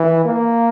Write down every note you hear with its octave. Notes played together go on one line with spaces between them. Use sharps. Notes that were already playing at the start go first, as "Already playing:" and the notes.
Already playing: E3
A#3